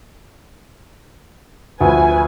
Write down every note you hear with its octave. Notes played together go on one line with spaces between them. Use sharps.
D2 F3 B4 G#5